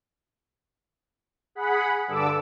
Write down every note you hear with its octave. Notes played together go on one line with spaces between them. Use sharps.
G#4 F#5 B5
G2 D3 A4 D6 E6